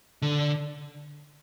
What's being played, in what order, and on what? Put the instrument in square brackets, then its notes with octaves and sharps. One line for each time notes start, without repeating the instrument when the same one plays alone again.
[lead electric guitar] D3